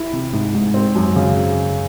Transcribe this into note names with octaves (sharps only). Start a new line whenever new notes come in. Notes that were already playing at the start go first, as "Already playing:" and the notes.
Already playing: E4
C3
G#2
G#2
C4
F#2
C#3